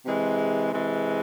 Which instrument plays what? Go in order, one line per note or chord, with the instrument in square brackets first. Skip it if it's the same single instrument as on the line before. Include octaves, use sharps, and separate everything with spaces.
[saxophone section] C3 E3 G#3
C3 E3 G#3